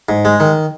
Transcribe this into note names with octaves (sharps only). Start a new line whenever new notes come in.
G#2
G#3
D#3